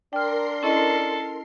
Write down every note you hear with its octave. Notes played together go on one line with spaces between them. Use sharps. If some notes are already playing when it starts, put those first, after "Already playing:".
D4 A#4 G5 C6 F6 C7
C#4 E4 A4 D#5